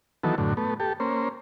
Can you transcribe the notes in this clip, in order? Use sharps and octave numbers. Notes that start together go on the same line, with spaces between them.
D#3 E3 F#3 B3 A4
F#2 A2 D3
A3 B3
G4 A4
A#3 C#4 C5